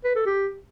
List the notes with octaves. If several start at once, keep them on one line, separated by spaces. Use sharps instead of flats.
B4
A4
G4